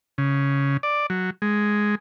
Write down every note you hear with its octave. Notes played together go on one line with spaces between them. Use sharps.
C#3
D5
F#3
G#3